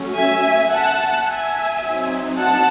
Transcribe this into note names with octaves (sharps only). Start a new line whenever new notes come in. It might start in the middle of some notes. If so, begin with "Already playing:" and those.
Already playing: F#3 A3 C#4
E5 G#5
F#5 A5
E5 G#5
F#3 C4 D#4
F#5 A5